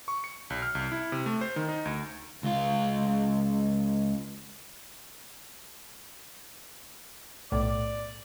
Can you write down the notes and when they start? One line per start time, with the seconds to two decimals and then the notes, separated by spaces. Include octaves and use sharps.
0.08 C#6
0.24 C#7
0.50 B1
0.62 F6
0.75 C2
0.92 E4
1.12 C3
1.26 A3
1.41 C5
1.56 D#3
1.69 D#4
1.85 D2
2.43 C#2 F4
7.52 B1 A2 D5